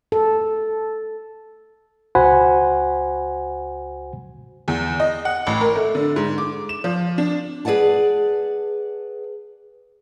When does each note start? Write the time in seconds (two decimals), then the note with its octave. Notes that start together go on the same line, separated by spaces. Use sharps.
0.12 A4
2.15 C#2 F#4 C5 F#5 G#5 B5
4.68 E2
5.00 D#5
5.25 F#5
5.47 A1
5.61 A#4
5.76 A3
5.95 D3
6.16 G#2
6.38 D6
6.69 E7
6.84 F3
7.18 D4
7.65 G#4 B4 D5 F#5 A5